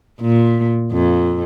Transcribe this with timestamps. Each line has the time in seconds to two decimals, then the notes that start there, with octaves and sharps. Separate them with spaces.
0.21 A#2
0.92 F2